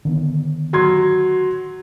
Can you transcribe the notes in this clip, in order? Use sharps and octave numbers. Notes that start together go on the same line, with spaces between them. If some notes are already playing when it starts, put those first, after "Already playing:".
D3 D#3 B3
F#3 C6 G#6